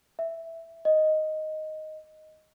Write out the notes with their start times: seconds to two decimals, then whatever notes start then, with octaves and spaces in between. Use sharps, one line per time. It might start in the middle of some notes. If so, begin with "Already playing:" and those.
0.19 E5
0.85 D#5